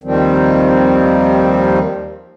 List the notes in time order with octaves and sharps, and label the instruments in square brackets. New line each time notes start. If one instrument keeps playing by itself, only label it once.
[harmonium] D#2 D#3 F3 G3 C4